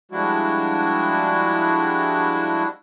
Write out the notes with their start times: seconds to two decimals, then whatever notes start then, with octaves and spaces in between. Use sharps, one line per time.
0.11 F3 G3 G#3 D4 E4 F#4